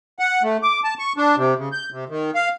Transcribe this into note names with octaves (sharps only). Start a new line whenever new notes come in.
F#5
A3
D6
A5
C#6
D4
C3
C#3
G6
C3
D#3
F5